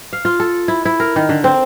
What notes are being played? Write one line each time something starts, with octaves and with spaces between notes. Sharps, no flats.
F5
F4
A4
E4
E4
A#4
D#3
D3
C4